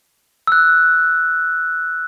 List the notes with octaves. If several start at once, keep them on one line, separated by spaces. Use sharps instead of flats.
E6 F#6